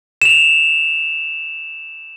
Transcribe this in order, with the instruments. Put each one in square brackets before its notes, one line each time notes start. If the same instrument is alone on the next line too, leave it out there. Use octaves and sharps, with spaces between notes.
[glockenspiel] E7 F7